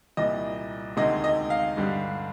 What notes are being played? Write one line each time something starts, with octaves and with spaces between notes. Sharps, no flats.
C2 A#2 G3 D#5
D2 C3 D#3 G#3 D#5
D#5
F5
G2 D3 G3